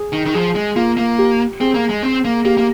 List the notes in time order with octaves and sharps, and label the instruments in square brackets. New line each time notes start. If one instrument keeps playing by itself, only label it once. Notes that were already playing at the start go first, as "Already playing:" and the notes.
Already playing: [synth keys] G#4
[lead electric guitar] D#3
D#3
[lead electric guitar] F3 [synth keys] G#4
[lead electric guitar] G#3
[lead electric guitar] A#3 [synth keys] F4
[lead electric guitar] A#3
[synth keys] G4
[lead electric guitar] C4 [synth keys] G#4
[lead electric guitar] A#3
G#3
C4
A#3
[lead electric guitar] A#3 [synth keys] G4
[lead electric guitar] A#3